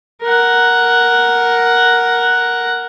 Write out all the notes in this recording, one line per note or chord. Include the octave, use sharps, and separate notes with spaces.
A#4 F#5